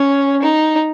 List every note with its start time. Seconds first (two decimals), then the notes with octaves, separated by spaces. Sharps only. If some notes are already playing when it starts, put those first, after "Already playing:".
Already playing: C#4
0.42 D#4